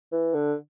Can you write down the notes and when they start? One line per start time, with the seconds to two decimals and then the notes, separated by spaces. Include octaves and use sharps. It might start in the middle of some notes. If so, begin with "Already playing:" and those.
0.12 E3
0.34 D3